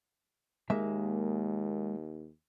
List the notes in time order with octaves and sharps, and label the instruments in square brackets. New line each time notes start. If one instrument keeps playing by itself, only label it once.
[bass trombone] D#2 [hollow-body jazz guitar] G#3 A#3 E5